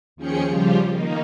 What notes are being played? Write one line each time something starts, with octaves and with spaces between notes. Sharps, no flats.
D#2 F3 C#4 G#4 G5 C#7
C#3 F3 G3 F4 G4
D#3 A#3 D#4